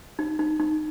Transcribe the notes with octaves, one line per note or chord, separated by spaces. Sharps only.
D#4
D#4
D#4